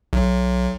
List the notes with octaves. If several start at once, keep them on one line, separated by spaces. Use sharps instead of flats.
B1